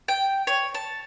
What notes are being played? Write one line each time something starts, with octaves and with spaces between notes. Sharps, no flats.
G5
C#5
A5